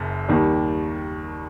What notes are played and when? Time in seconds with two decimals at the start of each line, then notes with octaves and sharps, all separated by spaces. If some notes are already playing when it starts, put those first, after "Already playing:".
Already playing: F#1 F#2
0.28 D#2 D#3 G3